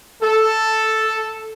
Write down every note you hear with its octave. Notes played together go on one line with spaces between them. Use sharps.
A4